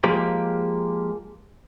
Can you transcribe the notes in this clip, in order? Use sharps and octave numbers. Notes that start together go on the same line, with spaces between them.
F3 G#3 A#3 G4